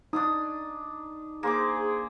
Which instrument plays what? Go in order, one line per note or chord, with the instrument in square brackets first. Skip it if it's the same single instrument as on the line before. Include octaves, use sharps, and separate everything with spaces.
[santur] D4 C6 D#6 [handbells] D#4
[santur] A#3 D6 [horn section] G#4 C5